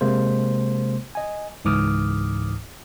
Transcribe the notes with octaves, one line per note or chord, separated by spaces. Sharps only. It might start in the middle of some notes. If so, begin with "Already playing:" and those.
C3 G#3 A#3 C5
D#5 G#5
C#2 G#2 E3 D6 D#6 F6